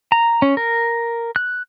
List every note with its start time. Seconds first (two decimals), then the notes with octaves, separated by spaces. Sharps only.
0.12 A#5
0.42 C#4
0.57 A#4
1.36 F#6